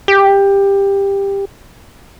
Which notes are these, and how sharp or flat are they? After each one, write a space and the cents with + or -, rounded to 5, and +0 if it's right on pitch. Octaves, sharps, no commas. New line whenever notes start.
G4 +15